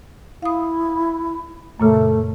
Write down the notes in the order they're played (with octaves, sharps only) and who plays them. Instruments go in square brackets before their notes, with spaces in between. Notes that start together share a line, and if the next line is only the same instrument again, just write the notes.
[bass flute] E4 [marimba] F5 D#6
[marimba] F#2 A#2 C#3 [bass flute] A3